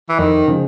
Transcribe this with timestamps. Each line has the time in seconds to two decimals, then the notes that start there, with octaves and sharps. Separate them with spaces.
0.09 E3
0.19 F2 D#3
0.48 C#3 F3 G#3